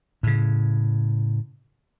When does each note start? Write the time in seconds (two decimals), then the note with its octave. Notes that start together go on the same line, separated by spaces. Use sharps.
0.23 A2 C#3